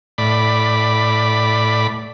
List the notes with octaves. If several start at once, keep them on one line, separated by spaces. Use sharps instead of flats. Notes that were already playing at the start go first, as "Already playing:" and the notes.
A2 D5 B5